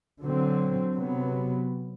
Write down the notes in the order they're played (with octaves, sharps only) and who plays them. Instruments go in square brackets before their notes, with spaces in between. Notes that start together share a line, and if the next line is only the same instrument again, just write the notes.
[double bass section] D3 F#3 C4
C3 F#3 B3